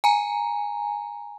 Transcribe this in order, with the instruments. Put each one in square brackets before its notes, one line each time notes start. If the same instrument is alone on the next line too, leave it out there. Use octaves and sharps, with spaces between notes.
[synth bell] G#5 A#5